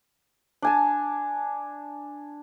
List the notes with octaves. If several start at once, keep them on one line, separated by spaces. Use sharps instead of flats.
D4 G#5 A5